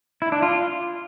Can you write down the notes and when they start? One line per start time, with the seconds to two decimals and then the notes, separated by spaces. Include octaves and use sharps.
0.22 E4
0.32 D4
0.42 F4